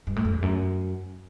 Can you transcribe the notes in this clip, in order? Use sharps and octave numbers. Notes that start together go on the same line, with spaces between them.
G2
A2
F#2
E2
F#2